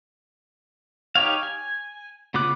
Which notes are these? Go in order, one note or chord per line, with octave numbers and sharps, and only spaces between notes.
D#4 G4 C#5 F5
G#5
C#3 B3 F4 D6 F#6